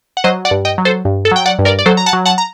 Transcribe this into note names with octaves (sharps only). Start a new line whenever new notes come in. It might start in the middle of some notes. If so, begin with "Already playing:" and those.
F#5
F#3 C5 D#5
D5 F#5
G2
D#5 G5
F#3
A4 C5
G2
A4
F#3 G5
D5 F#5
G2
A#4 D5
D5
F#3 A4 C5
A#5
F#5 A5
F#3
F#5 A5
A#5